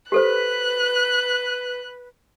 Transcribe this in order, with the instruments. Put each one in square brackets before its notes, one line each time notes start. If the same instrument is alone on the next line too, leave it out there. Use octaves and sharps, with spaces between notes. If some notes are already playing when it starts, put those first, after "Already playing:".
[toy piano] G4 A4 C5 [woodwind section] B4 [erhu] F#6